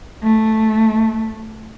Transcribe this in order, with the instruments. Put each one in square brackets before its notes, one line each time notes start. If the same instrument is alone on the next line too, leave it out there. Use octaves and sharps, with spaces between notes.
[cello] A3